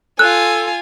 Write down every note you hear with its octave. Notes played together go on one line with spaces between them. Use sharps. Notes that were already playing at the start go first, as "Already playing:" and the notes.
F4 A4 G#5 F#6